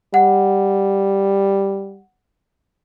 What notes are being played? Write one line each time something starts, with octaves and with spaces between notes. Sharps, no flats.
G3 F#5